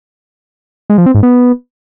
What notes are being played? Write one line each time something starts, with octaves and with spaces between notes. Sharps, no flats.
G#3
F3
C4
G#2
B3